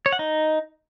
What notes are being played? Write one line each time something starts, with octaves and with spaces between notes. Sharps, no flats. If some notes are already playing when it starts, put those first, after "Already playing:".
C#5
F#5
D#4